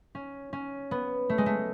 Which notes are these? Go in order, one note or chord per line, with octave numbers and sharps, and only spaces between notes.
C#4
C#4
B3
A3
G#3
A3